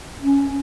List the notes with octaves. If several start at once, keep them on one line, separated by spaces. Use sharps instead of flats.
C#4